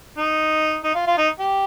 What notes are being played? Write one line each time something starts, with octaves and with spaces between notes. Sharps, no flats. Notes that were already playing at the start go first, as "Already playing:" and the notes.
D#4
D#4
F4
F4
D#4
G4